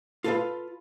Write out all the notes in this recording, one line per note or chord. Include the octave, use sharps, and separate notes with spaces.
F4 A4 B4 D#5 F5